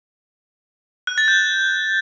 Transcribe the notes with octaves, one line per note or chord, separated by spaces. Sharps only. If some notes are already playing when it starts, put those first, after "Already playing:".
F#6
A6
G6